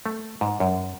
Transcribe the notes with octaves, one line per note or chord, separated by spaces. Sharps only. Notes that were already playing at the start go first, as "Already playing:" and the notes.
A3
G#2
F#2